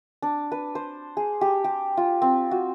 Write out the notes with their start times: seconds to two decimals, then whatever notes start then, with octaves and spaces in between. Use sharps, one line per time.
0.22 D4
0.52 B4
0.75 C5
1.17 G#4
1.41 G4
1.64 G4
1.97 F4
2.22 C4
2.51 F#4